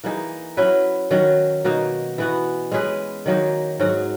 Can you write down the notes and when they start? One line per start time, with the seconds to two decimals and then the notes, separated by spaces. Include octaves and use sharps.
0.03 E3 A#3 D#4 G#4
0.57 F#3 C#4 E4 B4
1.11 D#3 F#3 C#4 F#4
1.64 B2 A#3 D#4 F#4
2.18 E3 B3 F#4
2.72 G#3 C#4 G#4 B4
3.26 D#3 F#3 A#3 D#4
3.80 G#2 F#3 C#4 F#4